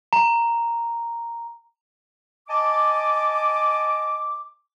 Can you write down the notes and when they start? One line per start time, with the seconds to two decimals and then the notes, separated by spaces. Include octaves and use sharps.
0.13 A#5
2.49 D#5 G#5 A5 D6